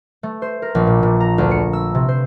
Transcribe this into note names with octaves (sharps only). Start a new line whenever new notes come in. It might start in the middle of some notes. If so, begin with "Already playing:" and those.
A3
C5
A#4
A#1
A#2
A#2
A#5
D2
C#7
E6
C3
C5